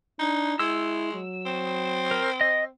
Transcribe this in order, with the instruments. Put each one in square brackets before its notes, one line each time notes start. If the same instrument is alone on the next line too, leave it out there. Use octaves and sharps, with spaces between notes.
[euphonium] D4 [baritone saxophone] D#4
[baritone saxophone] G#3 [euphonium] E4 [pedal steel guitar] E6
[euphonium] F#3
[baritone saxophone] C4
[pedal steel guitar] A#4
D#5